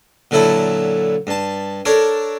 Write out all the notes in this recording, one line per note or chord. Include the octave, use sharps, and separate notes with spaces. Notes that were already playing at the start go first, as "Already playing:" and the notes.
A#2 D3 F#3 E4 A4
G2 A5
D4 A4 A#4 C#5